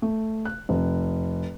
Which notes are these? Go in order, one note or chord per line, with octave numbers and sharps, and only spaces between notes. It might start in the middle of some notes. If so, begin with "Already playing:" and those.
A3
F#6
F1